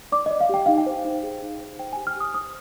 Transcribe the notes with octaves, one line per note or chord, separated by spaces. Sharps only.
D5 D6
D#5
D5
F5
G4 G5
D#4 F5
G5
C5
D#4
G#4
D#4
C5
C5 G5
G#5
G4
F6
G4 D#6
C5 D#6